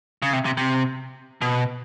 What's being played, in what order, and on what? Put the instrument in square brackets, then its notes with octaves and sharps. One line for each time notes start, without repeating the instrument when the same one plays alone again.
[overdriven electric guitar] C#3
C3
C3
C3
B2